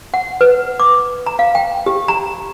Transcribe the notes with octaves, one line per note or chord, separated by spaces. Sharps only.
F#5
B4
D6
A#5
F5
G5
G4
A#5